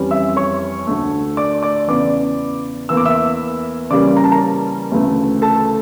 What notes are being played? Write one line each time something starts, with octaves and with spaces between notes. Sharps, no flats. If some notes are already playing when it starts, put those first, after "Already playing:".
Already playing: F2 E3 G3 C#4
E5 E6
C#5 C#6
D2 D3 A3
D5 D6
D5 D6
E2 C#3 E3 D5 D6
E2 E3 A#3 E6
D6
E5 E6
C#3 E3 G3 A#3 C#4 D5 D6
A#5
A5
A#4 A#5
D2 C#3 E3 A3
A4 A5